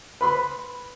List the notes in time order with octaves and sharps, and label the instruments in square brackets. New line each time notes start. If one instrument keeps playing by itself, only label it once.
[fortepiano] B4 B5 C6